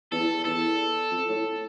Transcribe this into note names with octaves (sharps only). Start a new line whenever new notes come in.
E2 A4
E2 A4
F2
A2